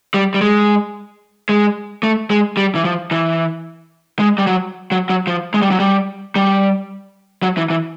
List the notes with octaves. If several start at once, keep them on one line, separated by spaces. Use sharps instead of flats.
G3
G3
G#3
G#3
A3
G#3
G3
E3
F3
E3
G#3
G3
F#3
F#3
F#3
F3
G#3
G3
F#3
G3
G3
F#3
E3
E3